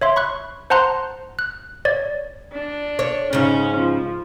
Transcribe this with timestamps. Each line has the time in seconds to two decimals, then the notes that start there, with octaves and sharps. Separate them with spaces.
0.01 C#5 E5 C6
0.16 B5 C#6 F#6
0.70 C5 F#5 A5 A#5 C6 F#6
1.39 F#6
1.85 C#5 D5
2.54 D4
2.99 C#5
3.33 G#2 C#3 C#4
3.77 F3